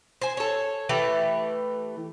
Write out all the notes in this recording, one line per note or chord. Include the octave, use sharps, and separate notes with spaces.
C5 G#5
A4 C#5
E3 A3 G4